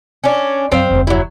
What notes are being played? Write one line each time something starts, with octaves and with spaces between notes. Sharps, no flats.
C#4 D4
F#2 C4 C5 F5
F1 D2
F#3 E4